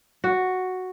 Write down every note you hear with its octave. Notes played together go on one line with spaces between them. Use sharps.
F#4